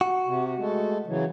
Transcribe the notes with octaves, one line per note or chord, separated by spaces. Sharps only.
F#4
C3
G#3 A3
C#3 E3 F#3